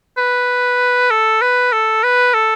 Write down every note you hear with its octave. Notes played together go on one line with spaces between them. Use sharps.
B4
A4
B4
A4
B4
A4